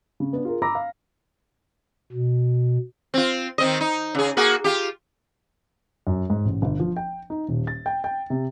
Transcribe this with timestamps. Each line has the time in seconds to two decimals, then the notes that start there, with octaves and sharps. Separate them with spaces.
0.20 C#3
0.33 B3 D4
0.45 F4 G#4 A#4
0.62 A#5 B5 D6 E6 A#6
0.75 F5
2.12 B2
3.14 C4 F4
3.58 D#3 C4 D#5
3.81 D#4
4.15 C#3 G#4
4.37 A#3 F#4 G#4
4.64 F4 G4
6.07 F#2
6.30 G#2
6.45 A1
6.62 G1
6.80 F3
6.97 G5
7.30 D#4
7.48 D#1
7.67 A6
7.86 G5
8.04 G5
8.30 C3